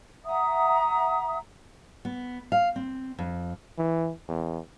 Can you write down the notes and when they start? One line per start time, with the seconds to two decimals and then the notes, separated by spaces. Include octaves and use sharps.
0.25 E5 F#5 A#5 D#6
2.05 B3
2.52 F5
2.76 C4
3.19 F2
3.78 E3
4.28 E2